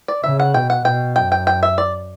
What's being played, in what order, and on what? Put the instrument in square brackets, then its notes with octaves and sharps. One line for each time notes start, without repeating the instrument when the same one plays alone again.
[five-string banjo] D5
[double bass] C#3 [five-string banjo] E5
[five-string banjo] F#5
[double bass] B2 [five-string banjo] G5
[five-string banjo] F#5
[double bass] B2 [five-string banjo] G5
[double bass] F#2 [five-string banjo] G5
[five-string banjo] G5
G5
E5
D5